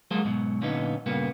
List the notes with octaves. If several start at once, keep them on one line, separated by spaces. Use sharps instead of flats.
F#3 G#3 A#3 F#4 A4 C5
G#2 B2 F#3
A#2 D3 F#3 B3 C#4 D#4
G2 A#2 C#3 A#3 B3